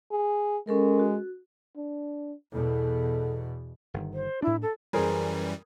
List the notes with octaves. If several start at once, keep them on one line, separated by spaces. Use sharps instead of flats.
G#4
G#3 C#4 A4 A#4
F#4
D4
E2 B2 A4
G1 D#3
C5
A2 D4 E4
A4
F#2 E3 G3 G#4 A#4 C5